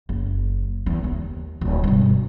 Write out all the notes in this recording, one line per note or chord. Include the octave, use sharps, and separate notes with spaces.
F#1
E2
D#2
D1
G2 B2